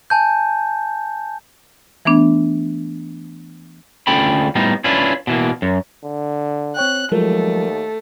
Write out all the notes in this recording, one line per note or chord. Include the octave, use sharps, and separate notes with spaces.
G#5 A5 G6
E3 A3 B3 D4
D2 C#4 F4 A4 G5 B5
A2 G3 B3 D#4 F4
C#4 D4 E4 F4 B4
B2 E3 A#3
F#2
D3
C4 C#5 G5 F#6
D#2 F3 F#3 G#3 A3 A#4